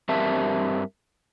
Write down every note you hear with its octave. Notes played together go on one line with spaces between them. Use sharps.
G2 C4 G4 A#4 E5 A5